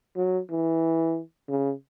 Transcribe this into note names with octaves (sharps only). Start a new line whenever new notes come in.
F#3
E3
C#3